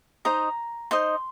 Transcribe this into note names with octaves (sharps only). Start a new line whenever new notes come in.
D#4 C5 D#5 A#5
D#4 C5 D#5 C6